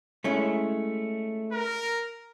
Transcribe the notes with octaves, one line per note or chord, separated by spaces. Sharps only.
G#3 A3 C#4 E4
A#4